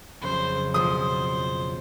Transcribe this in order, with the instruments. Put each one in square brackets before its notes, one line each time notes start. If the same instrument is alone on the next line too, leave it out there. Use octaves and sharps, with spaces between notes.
[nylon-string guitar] F2 C#3 F#3 [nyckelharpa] C5
[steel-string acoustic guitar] B2 F3 [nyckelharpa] C5 [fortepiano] D#6